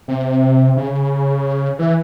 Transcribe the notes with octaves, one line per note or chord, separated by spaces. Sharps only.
C3
C#3
E3